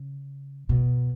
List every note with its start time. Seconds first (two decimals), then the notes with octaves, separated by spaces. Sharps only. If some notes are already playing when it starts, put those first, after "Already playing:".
Already playing: C#3
0.69 B2